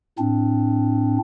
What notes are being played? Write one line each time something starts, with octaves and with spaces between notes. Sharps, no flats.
A2 C4 D4